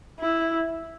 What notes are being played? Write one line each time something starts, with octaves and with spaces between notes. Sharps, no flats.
E4